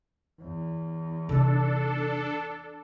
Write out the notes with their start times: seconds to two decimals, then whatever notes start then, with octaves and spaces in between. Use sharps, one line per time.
0.42 E2
1.29 C3 D4 D#4 A4